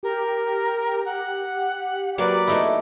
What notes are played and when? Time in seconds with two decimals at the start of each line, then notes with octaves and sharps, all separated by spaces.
0.03 G4 A#4
1.05 F#5
2.18 F#3 A#3 B4 D5
2.47 A3 D#4 E4